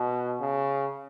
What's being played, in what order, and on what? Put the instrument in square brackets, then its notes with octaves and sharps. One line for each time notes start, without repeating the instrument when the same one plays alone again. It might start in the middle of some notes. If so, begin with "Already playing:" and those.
Already playing: [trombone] B2
C#3